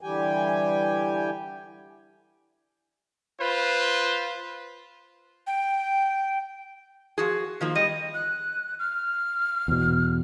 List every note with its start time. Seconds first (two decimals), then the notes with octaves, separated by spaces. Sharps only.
0.01 D3 E3 G3 G4 G5 G#5
3.40 F4 B4 C5
5.47 G5
7.18 F3 F#4 G#4
7.61 D#3 F3 A#3
7.75 G3 D#5
8.14 F#6
8.79 F6
9.68 E2 B2